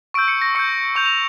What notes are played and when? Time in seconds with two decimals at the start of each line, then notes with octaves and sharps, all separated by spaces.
0.14 C#6 E6 G6 D7
0.28 C#7
0.42 A#6
0.55 C#6 E6 G6 C#7
0.95 C#6 G6 F7
1.06 F7